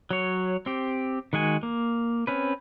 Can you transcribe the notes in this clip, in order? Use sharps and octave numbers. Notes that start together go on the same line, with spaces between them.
F#3 C#5
C4 G4
D#3 G#3 F#4 G#5
A#3
C4 C#4 B4